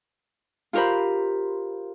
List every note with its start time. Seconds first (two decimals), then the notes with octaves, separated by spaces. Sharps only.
0.73 F4 G4 A#4 C5 B5